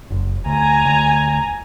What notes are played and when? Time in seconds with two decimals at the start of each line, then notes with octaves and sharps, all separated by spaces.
0.10 F#1
0.46 D2 G#5 A#5
0.86 D2